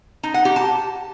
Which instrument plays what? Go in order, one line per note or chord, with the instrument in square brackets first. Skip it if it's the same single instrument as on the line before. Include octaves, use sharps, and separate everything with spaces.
[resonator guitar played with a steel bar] D#4
F#5
G4
A5